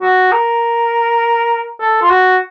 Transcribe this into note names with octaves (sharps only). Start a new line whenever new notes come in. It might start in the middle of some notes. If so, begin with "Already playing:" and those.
F#4
A#4
A4
F4
F#4